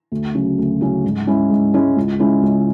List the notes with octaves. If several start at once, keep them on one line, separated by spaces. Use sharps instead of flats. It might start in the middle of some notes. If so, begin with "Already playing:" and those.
D2
C#3 F#3 C#4
D2
C#3 F#3 C#4
G#2
G#3 C#4 E4
G#2
G#3 C#4 E4
C#2
C#3 G#3 C#4 E4
C#2